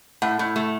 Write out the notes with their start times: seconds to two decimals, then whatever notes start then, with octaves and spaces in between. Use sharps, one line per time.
0.22 A2 F#5
0.39 A2
0.56 A3